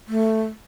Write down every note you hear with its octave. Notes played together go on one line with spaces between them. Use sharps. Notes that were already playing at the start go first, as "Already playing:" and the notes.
A3